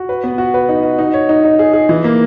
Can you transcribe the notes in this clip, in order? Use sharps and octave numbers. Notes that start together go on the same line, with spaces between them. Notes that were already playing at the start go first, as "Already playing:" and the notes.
Already playing: F#4
B4
B3
F#4
B4
D#4
F#4
D#4
C#5
D#4
D#4
G#4
G#4
E3
A#3